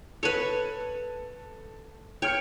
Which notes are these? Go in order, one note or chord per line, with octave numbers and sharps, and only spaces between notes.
A4 B4 C#5 D#7
C#5 G5 F6 C#7